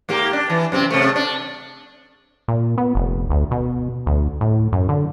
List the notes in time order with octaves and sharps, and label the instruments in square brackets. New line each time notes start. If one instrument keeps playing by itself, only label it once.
[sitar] G#2 A#3 G4
D4
E3
F#2 C3 C4
C3 A3
D4
[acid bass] A#2
B3
F1
D2
B2
D2
A2
F#2
D3